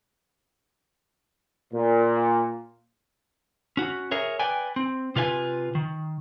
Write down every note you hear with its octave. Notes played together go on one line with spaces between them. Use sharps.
A#2
C#4 F#4
G#4 A#4 C#5 E5
B4 D5 G5 G#5
C4
C3 F4 B4 D#5 G#5
D#3